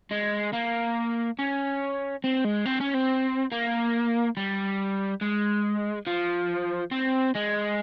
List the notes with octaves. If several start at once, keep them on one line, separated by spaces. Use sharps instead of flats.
G#3
A#3
C#4
C4
G#3
C4
C#4
C4
A#3
G3
G#3
F3
C4
G#3